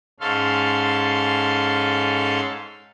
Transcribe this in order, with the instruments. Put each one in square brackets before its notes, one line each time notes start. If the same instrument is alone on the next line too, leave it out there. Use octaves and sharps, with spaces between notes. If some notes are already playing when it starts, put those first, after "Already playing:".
[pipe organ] G#2 C#4 A4 F5 C6